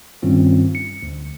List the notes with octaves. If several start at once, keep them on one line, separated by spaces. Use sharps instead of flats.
G2 D#3 G3 C4 C#4 F4
C#7
D2